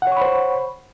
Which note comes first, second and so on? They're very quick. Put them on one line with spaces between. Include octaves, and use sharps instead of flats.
F#5 C#5 C#6 B5 C5